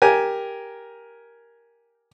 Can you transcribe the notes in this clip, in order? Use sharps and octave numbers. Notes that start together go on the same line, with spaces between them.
G4 A#4 G#5